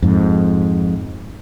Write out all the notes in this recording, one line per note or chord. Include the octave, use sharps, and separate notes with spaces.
F2 G#2